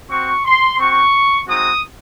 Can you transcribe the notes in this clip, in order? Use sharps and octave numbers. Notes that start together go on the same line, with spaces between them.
C4 F#4 C#6
C6
C4 F#4 C#6
G#3 C4 D#4 F#4 D#6